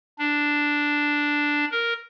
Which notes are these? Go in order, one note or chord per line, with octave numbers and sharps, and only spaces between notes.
D4
A#4